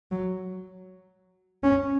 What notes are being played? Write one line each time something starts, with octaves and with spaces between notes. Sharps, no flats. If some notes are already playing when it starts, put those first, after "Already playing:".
F#3
C#4